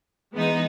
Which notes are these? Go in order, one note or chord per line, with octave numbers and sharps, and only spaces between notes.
E3 G#3 B3 D#4